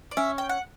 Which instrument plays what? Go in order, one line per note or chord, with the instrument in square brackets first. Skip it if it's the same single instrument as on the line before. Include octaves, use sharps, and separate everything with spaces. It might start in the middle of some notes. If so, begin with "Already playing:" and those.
[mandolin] D5
[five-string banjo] C#4 [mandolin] E5
[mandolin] G5
F#5